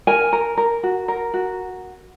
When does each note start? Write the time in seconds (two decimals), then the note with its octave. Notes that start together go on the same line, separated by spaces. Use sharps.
0.07 A#4 G#5
0.33 A#4
0.57 A#4
0.83 F#4
1.08 A#4
1.34 F#4